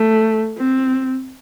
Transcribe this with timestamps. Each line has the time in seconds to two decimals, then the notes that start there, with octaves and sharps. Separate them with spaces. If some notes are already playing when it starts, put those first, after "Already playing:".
Already playing: A3
0.57 C4